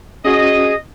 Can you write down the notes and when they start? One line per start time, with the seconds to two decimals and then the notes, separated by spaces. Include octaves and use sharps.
0.25 C#4 F#4 G#4 D#5